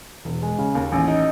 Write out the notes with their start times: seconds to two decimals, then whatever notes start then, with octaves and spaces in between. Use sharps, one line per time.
0.25 E1
0.42 G#3
0.58 C#3
0.75 D#2
0.92 A1
1.08 D#4